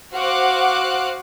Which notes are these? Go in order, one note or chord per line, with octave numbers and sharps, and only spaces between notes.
F#4 C5 F5 F#5 D6 F#6